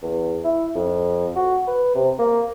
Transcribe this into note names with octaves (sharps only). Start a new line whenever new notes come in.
E2
E4
F2
F#4
B4
C3
A#3